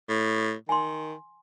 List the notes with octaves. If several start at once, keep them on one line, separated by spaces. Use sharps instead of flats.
A2
D#3 G#5 C6